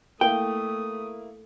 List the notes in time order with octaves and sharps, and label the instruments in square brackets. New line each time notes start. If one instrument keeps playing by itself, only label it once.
[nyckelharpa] A3 D#6 [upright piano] A#3 E4 [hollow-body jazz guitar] G5